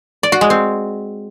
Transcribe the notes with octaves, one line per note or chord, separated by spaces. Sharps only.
D5
F#4
G#3
C4